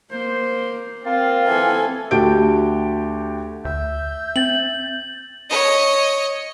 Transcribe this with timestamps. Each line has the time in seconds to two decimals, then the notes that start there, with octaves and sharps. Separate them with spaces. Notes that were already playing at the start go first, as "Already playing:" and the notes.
0.12 A#3 C5
1.06 A#3 C4 F4
1.47 E3 A4 G#5
2.11 D2 F#4 G4 A5 G6 D7
3.65 D2 E5 G6
4.36 C4 A6 F#7
5.49 C#5 D#5